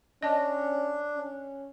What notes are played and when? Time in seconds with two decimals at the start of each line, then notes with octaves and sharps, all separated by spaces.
0.23 C#4 D4 D#5 A5
1.15 C#4